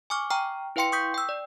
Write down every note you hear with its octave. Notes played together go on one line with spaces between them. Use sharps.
G#5 C#6 D6 F6
G5 A#5 C#6 F6
E4 B4 F5 G5 C6 C#7
C#6 D#6 G6 B6
G5 E6
D5